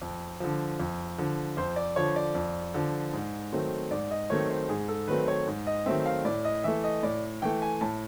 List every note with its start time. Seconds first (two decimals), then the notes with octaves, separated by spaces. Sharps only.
0.02 F2
0.40 D3 F3
0.80 F2
1.18 D3 F3
1.57 F2 C5
1.76 D5
1.96 D3 F3 C#5
2.16 D5
2.35 F2
2.74 D3 F3
3.13 G#2
3.52 D#3 F#3 A3 C4
3.91 G#2 D5
4.11 D#5
4.30 D#3 F#3 A3 C4 C#5
4.50 C5
4.68 G#2 G#4
4.88 A4
5.08 D#3 F#3 A3 C4 B4
5.28 C#5
5.47 G#2
5.67 D#5
5.86 D#3 F#3 A3 C4 E5
6.06 F5
6.25 A2 D5
6.45 D#5
6.64 E3 A3 E5
6.84 D#5
7.03 A2 D5
7.42 E3 A3 G5
7.62 G#5
7.81 A2 A5